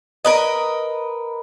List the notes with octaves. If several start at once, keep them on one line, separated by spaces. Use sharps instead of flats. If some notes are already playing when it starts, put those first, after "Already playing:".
A#4 B4 D#5